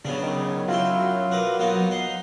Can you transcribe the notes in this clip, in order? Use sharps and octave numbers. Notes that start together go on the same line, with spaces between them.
C#3 F#3 B3 D4
D#3
F#2 F#3 E4 F4 G5
A#4 B4 D6
A#3 B3 D#4 F#4
D#4 C6